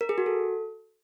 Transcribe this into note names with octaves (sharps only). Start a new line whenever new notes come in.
A#4
G#4
F#4
A4